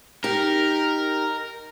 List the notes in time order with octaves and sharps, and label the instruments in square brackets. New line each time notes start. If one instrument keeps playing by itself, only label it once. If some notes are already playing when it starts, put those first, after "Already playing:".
[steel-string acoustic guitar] D#4 G4 [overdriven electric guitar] A#4